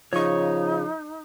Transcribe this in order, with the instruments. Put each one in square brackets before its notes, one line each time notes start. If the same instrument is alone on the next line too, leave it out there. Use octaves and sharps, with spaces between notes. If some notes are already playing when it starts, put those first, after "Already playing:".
[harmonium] C#3 [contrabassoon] F3 [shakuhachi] D#4 [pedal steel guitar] C#5 C#6